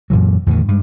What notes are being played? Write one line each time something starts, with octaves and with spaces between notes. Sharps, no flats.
F#2 A#2 E3 F#3
E2 A2 D3 D#3
G2 G#3